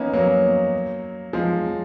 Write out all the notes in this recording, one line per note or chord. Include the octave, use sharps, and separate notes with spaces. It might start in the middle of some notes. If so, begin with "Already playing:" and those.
Already playing: A#3 B3 C#4 D#4
F#3 A#3
F3 G#3